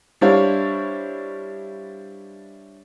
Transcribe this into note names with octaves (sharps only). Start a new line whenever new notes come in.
G3 D4 E4 C5 C#5 F5